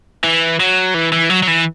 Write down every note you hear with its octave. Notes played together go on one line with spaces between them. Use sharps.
E3
F#3
E3
E3
F#3
F#3
E3